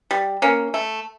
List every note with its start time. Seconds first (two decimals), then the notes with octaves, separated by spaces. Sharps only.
0.11 G3
0.42 A#3 C#4
0.74 A3